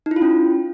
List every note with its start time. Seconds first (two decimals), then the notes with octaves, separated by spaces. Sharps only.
0.06 D#4
0.11 E4
0.16 F4
0.21 C#4